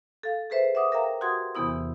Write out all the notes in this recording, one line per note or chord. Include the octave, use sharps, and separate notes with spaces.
A4 F5
G#4 A4 B4 C5 E5
E5 F#5 D6 D#6
A#4 E5 F5 G5 A#5
F#4 G4 F#5 C6 D#6 G#6
E2 C3 E3 B3 E4 D#6